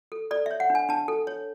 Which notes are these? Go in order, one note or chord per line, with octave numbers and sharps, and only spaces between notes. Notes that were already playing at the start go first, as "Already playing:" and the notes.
A4
A4 D5
C#5 E5
F#5
D4
G#5
D4 A5
A4
C#5